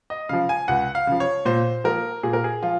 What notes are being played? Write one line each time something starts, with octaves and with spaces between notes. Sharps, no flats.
D#5
C#3 F3 F5
G#5
C#2 F#5
F5
C#3 F3
C#5
A#2 C5
F3 A#3 A#4
A#2 G#4
A#4
G#4
F3 F4